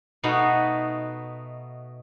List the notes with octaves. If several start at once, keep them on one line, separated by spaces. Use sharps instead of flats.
B2 A3 B3 D#4 F#4